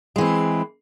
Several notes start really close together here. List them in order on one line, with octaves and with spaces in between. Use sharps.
G#3 E3 C4